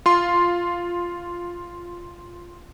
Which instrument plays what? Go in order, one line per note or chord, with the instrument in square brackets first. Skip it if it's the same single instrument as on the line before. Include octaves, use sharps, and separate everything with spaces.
[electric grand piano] F4 C6